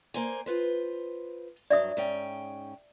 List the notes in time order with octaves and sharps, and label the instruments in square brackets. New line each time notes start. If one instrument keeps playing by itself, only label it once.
[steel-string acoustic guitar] A#3 C5 G#5
F4 B4 C5
[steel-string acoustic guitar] G2 F#3 [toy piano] D5 E5 D#6
[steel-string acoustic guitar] G#2 C#4 G5